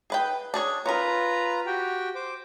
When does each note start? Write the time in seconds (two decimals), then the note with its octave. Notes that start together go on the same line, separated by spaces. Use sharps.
0.10 G#4 B4 G5
0.54 D4 G#4 C#5
0.86 C#4 F4 A#4 B4 A#5
1.66 F#4 G4 G5
2.15 C5 D6